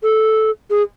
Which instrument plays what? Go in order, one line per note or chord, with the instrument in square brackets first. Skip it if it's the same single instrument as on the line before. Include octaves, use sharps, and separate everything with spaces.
[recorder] A4
G#4